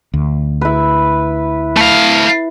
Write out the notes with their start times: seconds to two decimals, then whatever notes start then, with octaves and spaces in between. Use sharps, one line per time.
0.14 D2
0.61 E4 B4
1.77 A3 F5